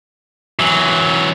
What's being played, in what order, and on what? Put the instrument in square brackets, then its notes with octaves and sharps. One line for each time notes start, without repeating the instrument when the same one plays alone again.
[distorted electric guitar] E3 F#3